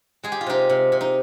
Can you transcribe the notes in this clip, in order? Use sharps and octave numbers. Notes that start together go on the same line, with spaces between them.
G#3 G#4
G4
F4
C3 D#4 G4
C3
C3
D#4